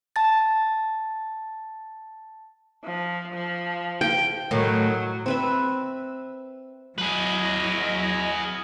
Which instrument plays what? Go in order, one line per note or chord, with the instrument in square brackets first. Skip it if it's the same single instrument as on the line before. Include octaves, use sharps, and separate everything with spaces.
[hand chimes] A5 A6
[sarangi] F3
F3
[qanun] G5
[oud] A2 D#3 [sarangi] F#3
[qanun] C4 B4 E5
[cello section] F#3 E4 D#5 [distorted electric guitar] G#4 B4